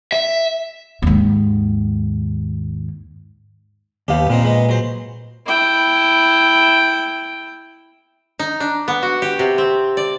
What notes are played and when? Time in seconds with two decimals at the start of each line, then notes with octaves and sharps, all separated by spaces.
0.12 E5
1.02 D#2 G#2
4.08 D#2 B3 G4 F5
4.30 A#2 B3 C4 D#5
4.43 G#3 B3 D#5
4.69 F#3 C5
5.46 E4 G5
8.39 D#4
8.60 D4
8.88 B3
9.03 F#4
9.22 G4
9.39 C3
9.58 C4
9.97 D5